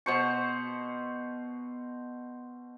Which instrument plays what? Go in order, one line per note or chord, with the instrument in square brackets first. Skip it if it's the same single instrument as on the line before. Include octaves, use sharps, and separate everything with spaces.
[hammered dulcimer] B2 C5 C#6